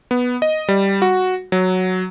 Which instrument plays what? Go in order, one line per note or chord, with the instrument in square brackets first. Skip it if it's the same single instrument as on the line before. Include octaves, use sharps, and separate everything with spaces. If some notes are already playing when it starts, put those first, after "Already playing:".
[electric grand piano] B3
D#5
G3
F#4
F#3